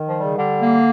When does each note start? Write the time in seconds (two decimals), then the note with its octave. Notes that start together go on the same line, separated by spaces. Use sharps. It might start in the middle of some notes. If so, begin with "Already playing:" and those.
Already playing: D#3
0.08 F3
0.16 G3
0.23 C#3
0.38 D3 G3
0.60 A#3